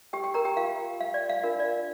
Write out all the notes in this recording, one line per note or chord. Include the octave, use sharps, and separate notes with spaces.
G4 G5
G4 G5
A#4 A#5
G4 G5
F4 A#4 F5
F5
D5
F5
D4 F4 A#4 F5
D5
F5